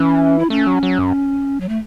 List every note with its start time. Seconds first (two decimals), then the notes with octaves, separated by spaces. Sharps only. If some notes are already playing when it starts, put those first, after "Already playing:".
Already playing: E3 C#4
0.39 E4
0.50 A3 C#4
0.67 F#3
0.83 F#3
0.98 F#2
1.60 F#3
1.69 A3